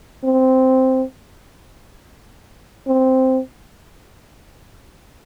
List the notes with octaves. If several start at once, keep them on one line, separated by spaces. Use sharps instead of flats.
C4
C4